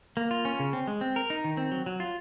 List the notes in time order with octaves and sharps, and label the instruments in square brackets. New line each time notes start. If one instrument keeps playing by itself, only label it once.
[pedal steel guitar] A#3
F4
C#4
C#3
C4
G#3
C4
A#4
D#4
D#3
C4
F#3
F#3
F4